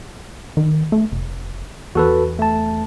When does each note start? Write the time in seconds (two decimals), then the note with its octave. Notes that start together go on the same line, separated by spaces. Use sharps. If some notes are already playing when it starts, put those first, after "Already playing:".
0.57 D#3
0.92 A3
1.12 F1
1.95 E2 F#4 A4 B4
2.39 A3 A5